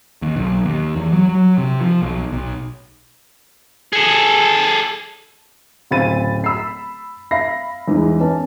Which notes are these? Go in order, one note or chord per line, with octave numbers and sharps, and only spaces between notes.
D#2
B1
D#2
E2
F#3
F#3
C3
F3
B1
B1
G#4 A4
D1 C#3 C4 B5 A6 D#7
B5 E6 C7
E5 F5 B5 A#6 C7
E2 G#2
B3 C#4 B4 A5